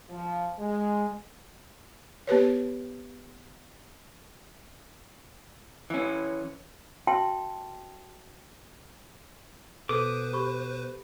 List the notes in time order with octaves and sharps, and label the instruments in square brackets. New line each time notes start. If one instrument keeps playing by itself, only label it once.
[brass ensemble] F3
G#3
[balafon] B3 G4 B4 C#5
[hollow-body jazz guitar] E3 C#4
[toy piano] F#4 E5 G5 A5 C6
[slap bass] B2 [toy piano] A4 [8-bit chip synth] B4 C5 [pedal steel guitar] D6 D#6
[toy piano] G4 B5 C#6